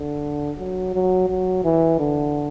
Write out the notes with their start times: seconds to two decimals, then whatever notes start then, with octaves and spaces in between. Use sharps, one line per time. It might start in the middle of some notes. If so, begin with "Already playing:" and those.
Already playing: D3
0.58 F#3
0.95 F#3
1.29 F#3
1.64 E3
1.99 D3